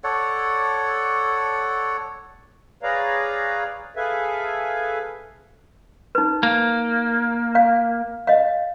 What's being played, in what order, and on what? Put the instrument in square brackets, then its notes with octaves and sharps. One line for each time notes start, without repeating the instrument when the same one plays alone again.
[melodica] A4 C#5 D5 F#5
[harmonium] G#4 B4 C#5 D5 F5 A#5
G#4 A4 B4 E5 F5 G#5
[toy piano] D#4 B4
[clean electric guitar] A#3
[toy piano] F5
D#5 F5